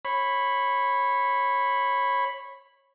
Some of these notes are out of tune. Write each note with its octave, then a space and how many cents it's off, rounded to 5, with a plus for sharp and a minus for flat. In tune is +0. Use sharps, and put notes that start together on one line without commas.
C#5 -20 B5 +0